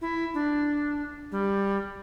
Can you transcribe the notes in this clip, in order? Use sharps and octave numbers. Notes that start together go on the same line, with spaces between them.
E4
D4
G3